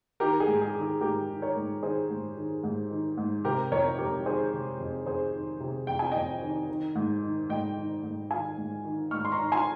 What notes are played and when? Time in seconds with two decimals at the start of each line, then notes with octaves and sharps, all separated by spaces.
0.20 D#3 G4 A#4
0.40 G#4
0.47 G#2
0.61 G#4
0.75 D#3
0.81 G#4
1.01 G#2 G4 A#4
1.28 D#3
1.42 A#4 C#5
1.56 G#2
1.82 D#3 G#4 C5
2.10 G#2
2.37 D#3
2.63 G#2
2.90 D#3
3.17 G#2
3.45 C3 G4 A#4
3.71 F2 A#4 C#5
3.98 F2 G4 A#4
4.26 D#3 G#4 C5
4.53 C3
4.79 F2
5.06 F2 G#4 C5
5.33 D#3
5.60 C3
5.87 F2 G5
5.99 G#5
6.12 F2 D#5 G5
6.41 D#3
6.69 D#3
6.95 G#2
7.22 D#3
7.49 G#2 D#5 G5
7.77 D#3
8.03 G#2
8.31 D#3 F5 G#5
8.57 G#2
8.85 D#3
9.11 G#2 C#6 F6
9.25 C6
9.32 A#5 C#6
9.38 D#3
9.52 G#5 C6